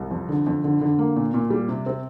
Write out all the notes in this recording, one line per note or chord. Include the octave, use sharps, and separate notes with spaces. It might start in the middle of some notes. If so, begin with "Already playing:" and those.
Already playing: C2
F2
D3
F2
D3
D3
A#3
A#2
A#2
G3
C3
C4